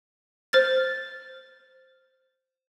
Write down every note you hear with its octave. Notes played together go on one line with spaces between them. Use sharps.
C5 F6 A6